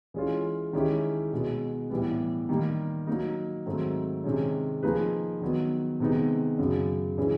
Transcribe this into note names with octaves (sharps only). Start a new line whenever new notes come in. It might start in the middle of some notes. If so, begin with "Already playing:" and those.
E3 G#3 C#4 F4
D#3 G#3 C#4 E4 G4
B2 G#3 B3
A2 E3 G3 B3
D#3 G3 A#3
F#3 A#3 D#4
G#2 D#3 F#3 A3 C4
C3 D#3 G#3 C#4
F3 A#3 D#4 G#4 B4
D#3 F#3 B3
C3 D#3 G#3 B3 D#4
F#2 C#3 F#3
C#3 E3 G#3 C#4